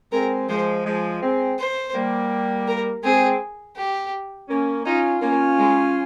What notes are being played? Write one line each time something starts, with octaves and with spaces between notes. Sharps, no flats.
G#3 C4 A#4
F3 G#3 C5
F3 G#3
G#3 C4
C5
G3 A#3
A#4
G#3 C4 G#4
G4
A#3 C#4
C#4 D#4 F4
A#3 C#4 F4
G#3